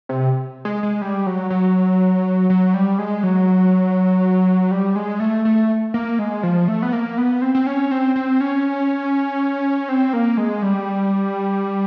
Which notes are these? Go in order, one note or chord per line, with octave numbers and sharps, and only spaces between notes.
C3
G#3
G#3
G3
F#3
F#3
F#3
G3
G#3
F#3
G3
G#3
A3
A3
A#3
G#3
F3
A3
B3
A#3
B3
C4
C4
C#4
C4
C4
C#4
C4
A#3
G#3
G3